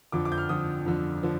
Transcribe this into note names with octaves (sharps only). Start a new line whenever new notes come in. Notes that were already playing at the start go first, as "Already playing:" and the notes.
F2 D3 F3 D6
D6
G6
F6
F2 D3 F3 D#6
F2 D3 F3
D3 F3